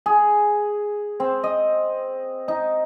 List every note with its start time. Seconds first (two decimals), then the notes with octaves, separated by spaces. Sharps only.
0.06 G#4
1.20 C4
1.44 D#5
2.48 D#4